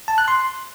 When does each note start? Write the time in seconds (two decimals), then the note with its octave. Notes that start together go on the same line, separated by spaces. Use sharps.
0.08 A5
0.18 F#6
0.28 C6